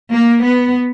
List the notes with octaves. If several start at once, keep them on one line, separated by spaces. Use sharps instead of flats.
A#3
B3